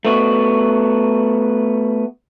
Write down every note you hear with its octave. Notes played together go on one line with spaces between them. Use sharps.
A3 B3 F#4